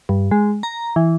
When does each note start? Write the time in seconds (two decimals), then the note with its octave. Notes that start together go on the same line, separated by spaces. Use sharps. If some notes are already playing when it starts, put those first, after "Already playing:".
0.09 G2
0.31 G#3
0.63 A#5
0.96 E3